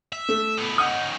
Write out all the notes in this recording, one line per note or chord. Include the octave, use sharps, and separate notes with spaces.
E5
A3
A2 B3
C#4 D#4 F#5 D#6